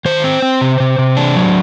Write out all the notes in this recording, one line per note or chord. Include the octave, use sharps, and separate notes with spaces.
D#3 C5
C4
C4
C3
C3
C3
D4
F#3